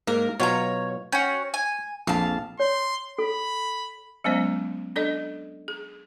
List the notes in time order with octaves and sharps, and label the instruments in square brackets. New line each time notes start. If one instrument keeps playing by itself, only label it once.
[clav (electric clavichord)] G#2 A#3 [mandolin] A#4
[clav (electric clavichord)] B2 F#3 F4 [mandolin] C#5 A#5
[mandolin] C#4 F#4 [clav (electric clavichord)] G5
[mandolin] G#5
[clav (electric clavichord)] A#1 F2 [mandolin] F5 A5
[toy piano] C#5 [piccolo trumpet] C6
[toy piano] A4 [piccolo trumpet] B5
[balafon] F#3 G#3 B3 C#4 C5 D5
D4 A4 D5 D#5
G#4